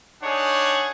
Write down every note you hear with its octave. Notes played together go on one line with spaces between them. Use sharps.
D4 D#4 G#4 C#5 F#5